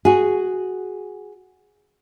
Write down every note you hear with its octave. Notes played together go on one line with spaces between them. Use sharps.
F#4 G#4